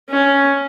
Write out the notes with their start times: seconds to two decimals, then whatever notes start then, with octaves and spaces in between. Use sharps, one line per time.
0.10 C#4